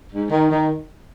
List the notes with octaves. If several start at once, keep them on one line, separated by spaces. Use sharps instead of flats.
G#2
D#3
D#3